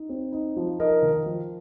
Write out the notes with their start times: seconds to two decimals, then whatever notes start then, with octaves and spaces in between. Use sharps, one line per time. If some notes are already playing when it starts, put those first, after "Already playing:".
Already playing: D#4
0.09 C4
0.32 D#4
0.56 F3
0.80 D#4 A#4 D#5
1.02 D#3
1.26 F3